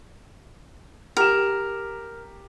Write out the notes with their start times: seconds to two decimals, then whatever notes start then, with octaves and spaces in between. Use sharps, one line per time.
1.17 G4 A#4 E7